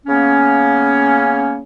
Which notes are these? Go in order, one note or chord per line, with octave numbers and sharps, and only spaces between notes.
C#3 A#3 B3 C#4